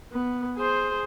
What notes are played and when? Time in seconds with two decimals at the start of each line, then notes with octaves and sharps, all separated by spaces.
0.12 B3
0.56 G#4 C5